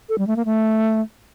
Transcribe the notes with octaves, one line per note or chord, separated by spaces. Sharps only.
A4
G3
A3
A#3
A3